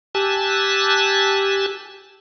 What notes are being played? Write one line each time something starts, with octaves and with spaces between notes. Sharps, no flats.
G4 G#5 A5 E6 F#6